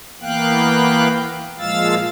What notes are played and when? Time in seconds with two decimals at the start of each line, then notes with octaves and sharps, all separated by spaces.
0.21 E3 A#3 B3 F5 G5 F#6
1.59 A#2 F3 G#3 F5 E6 A6